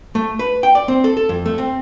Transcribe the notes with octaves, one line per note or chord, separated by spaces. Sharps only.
A3
B4
G5
D5
C4
A4
A4
F2
A3
C4